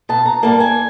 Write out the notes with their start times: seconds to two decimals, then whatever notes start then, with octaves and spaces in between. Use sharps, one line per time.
0.09 B2 A5
0.26 A#5
0.43 G3 A#3 A5
0.60 G#5